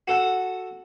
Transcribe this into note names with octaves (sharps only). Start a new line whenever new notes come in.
F#4 A4 F#5